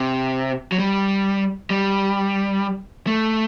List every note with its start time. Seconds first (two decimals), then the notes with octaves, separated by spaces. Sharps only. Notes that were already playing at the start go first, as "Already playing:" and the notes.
Already playing: C3
0.72 F#3
0.79 G3
1.70 G3
3.07 A3